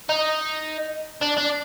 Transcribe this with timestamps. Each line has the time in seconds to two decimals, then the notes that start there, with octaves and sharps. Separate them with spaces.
0.09 D#4
1.22 D4
1.38 D4